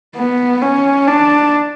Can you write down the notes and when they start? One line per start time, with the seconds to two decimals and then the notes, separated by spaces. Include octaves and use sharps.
0.16 B3
0.62 C#4
1.07 D4